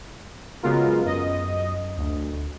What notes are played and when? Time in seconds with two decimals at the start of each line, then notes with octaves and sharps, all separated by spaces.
0.63 C#3 F#3 G#3 B3 F4 A#4
1.05 F#2 D#5
1.97 D2